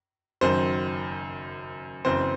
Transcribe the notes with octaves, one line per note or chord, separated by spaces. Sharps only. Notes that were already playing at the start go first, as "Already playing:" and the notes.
F#1 F#2 D#3 F#3 C5
F#1 F#2 E3 C4 C5